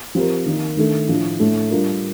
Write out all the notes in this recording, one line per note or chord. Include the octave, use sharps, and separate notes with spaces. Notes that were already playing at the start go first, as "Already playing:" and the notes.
F3 C4 G4 A#4
D#3 A#3 D#4
D#3 A3 D4 A4
A2 F3 A3 D4
A2 A3 D4 A4
G3 D4 F4 A#4